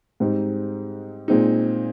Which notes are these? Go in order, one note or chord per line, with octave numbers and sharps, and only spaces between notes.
G#2 G3 C4 D#4
A#2 G#3 C4 D#4